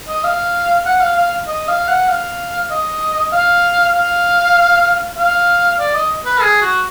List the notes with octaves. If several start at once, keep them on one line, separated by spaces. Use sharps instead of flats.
D#5
F5
F#5
F5
F5
D#5
F5
F#5
F5
D#5
F5
F5
F5
D5
D#5
B4
G#4
F#4